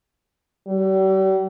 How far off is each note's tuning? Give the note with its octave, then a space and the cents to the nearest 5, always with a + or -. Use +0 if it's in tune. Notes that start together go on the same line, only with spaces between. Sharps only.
G3 -45